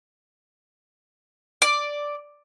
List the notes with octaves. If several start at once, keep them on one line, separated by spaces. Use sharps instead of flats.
D5